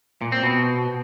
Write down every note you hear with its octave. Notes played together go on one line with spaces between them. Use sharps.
A#2
C4
B2